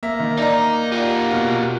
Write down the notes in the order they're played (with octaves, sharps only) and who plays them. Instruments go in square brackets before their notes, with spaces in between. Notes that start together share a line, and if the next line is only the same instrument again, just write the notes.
[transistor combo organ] A#3 [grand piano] E5
[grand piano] D#3
[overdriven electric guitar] D#4 D#5 [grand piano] D5 A#5
[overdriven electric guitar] F4 G4 [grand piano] D5
[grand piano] B2